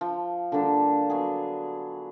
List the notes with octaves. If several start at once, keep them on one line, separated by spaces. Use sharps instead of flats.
F3
D3 G3 A#3 D4
F#3 B3 G#4